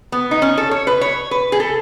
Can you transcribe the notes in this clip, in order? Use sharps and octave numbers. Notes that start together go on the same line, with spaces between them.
B3
D#4
C#4
A4
C#5
B4
C#5
B4
G#4
A4